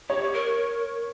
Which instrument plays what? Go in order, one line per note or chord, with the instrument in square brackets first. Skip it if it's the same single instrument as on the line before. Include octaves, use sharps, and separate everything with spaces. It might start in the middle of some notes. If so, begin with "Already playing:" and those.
[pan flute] G4 [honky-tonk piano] C#5
[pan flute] A#4